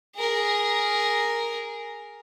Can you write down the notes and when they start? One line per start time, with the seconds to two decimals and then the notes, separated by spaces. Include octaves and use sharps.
0.17 G#4 A#4